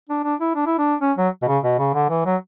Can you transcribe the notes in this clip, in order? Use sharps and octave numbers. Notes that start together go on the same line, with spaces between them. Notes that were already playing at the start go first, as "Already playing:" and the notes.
D4
D4
E4
D4
E4
D4
C#4
F#3
B2
C#3
B2
C#3
D3
E3
F#3